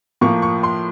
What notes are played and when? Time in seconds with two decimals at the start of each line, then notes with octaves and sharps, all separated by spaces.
0.21 A2 F3 A#3 C#6
0.42 C#6
0.63 C6